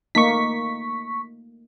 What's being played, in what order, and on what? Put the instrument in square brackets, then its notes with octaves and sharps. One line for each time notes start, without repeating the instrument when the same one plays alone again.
[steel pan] A3 A#3 D#4 [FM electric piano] C#6 B6